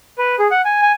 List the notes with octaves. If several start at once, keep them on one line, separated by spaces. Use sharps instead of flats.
B4
G#4
F#5
G#5
G#5